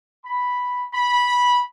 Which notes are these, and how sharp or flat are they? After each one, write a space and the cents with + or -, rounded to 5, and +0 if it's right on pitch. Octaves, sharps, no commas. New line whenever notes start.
B5 +0
B5 -15